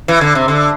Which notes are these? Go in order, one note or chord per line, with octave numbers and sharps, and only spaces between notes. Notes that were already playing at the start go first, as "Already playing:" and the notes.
E3
D3
C3
D3